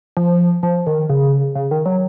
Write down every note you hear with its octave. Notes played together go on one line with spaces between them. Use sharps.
F3
F3
D#3
C#3
C#3
D#3
F#3